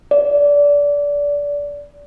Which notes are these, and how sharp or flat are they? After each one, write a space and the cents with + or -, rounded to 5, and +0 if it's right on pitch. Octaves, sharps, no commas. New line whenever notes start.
D5 -20